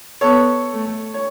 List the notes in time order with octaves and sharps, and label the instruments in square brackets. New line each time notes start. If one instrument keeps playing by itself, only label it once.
[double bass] B3 [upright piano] A4 C#5
[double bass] A3
[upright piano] C#5